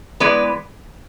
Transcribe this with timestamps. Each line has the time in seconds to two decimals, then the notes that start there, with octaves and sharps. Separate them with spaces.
0.20 E3 G#3 B3 B4 D5